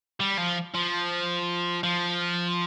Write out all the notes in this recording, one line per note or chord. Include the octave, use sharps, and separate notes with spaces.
G3
F3
F3
F3